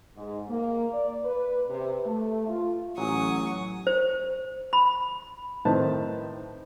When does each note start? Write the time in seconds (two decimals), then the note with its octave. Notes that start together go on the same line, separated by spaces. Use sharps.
0.17 G#2
0.50 A#3
0.92 D5
1.24 B4
1.69 C3
2.06 A3
2.48 F4
2.98 A1 F#3 G#5 C#6 D#6
3.87 C5
4.73 B5
5.65 A2 D#3 C4 B4 A5